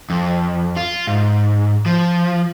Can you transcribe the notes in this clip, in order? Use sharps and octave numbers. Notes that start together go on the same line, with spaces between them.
F2
F4
G#2
F3